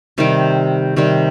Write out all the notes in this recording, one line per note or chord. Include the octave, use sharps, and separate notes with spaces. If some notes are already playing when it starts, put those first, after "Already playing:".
C3 D#3 G3
C3 D#3 G3